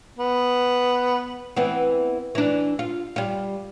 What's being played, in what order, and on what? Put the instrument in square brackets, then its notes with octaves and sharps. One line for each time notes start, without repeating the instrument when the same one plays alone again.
[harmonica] B3
[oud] E3 B3 C4
E3 D4
F4
G3 F4